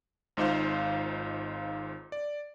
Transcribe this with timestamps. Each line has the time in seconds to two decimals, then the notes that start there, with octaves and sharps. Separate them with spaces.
0.37 G#1 G#2 D#4 F4 C5 F5
2.12 D5